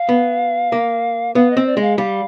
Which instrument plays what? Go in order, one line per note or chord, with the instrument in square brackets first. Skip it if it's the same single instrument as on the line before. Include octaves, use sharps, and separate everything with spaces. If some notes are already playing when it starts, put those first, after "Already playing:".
Already playing: [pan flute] F5
[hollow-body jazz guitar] B3
A#3
[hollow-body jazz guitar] B3 [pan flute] F5
[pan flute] D#5
[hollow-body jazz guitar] C4
[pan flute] D5
[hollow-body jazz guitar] G#3 [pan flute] F5
[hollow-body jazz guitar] G3 [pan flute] F5